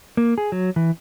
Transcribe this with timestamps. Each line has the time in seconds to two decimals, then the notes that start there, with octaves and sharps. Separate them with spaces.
0.17 A#3
0.38 G#4
0.52 F#3
0.76 E3